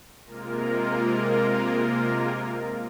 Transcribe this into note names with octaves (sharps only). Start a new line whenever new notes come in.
C3 G#3 A#3 F4 A#4